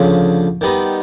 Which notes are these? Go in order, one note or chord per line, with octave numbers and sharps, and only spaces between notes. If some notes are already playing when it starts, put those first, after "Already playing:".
Already playing: D2 C#3 F3
D#3 G3 B3 D#4